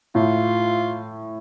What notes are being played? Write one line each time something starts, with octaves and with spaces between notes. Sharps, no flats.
A2 F4